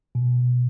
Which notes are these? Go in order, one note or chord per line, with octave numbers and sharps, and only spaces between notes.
B2